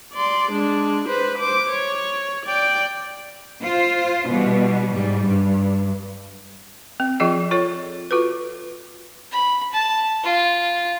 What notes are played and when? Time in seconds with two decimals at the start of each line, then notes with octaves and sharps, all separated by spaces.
0.13 D5 C6
0.51 G#3 D4
1.09 B4 C5
1.39 C5 D6
1.69 C#5
2.46 D5 G5
3.62 F4 C5
4.27 B2 E3 G3
4.91 G#2 G3
5.27 G2
7.00 C4
7.20 F3 C4 F4 G#4 D#5
7.51 F4 A4 C#5
8.11 F4 F#4 A4 B4
9.31 B5
9.73 A5
10.24 F4